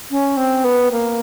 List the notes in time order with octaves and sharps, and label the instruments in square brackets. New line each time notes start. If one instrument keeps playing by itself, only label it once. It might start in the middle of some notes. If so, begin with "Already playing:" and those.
[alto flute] C#4
C4
B3
A#3